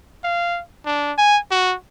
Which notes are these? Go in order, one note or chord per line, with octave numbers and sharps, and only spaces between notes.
F5
D4
G#5
F#4